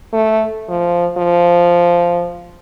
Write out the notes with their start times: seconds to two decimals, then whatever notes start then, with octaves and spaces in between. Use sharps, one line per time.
0.13 A3
0.69 F3
1.18 F3